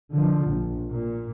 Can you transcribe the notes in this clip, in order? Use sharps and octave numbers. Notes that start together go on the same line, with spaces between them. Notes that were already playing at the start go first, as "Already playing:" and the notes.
D3 F3
A#1
A#2